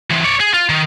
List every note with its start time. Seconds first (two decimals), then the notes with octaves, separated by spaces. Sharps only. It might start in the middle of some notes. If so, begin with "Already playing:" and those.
0.10 E3 C4
0.24 C#5 D5
0.40 G#4
0.54 F4
0.69 D#3